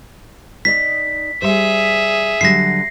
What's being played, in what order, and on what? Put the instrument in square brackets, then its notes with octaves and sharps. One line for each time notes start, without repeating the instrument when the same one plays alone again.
[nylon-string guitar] D#4 D5 D#5 [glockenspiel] B6
[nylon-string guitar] G3 C5 [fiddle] G#4 E5
[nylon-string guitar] D3 F#3 G3 [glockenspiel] A#6 C7